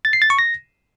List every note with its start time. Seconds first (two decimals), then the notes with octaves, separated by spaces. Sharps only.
0.05 A6
0.13 C7
0.22 A6
0.30 C#6
0.39 A#6